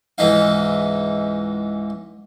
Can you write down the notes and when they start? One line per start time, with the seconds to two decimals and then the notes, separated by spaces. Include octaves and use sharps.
0.18 C#2 G#2 E3 D#4 F5